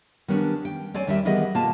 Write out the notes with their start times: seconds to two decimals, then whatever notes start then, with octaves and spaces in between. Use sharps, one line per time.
0.28 D#3 G3 B3 C#4 D4
0.65 G5
0.94 C4 C#5 D5 G#5
1.07 D#2 D#3 G3 G4 G#4 E5
1.25 D#3 E3 G3 B3 G#4 D#5
1.54 B2 A#3 F4 A5